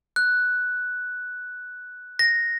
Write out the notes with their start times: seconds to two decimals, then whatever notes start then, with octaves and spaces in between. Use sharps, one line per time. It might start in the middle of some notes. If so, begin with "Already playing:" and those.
0.16 F#6
2.19 A#6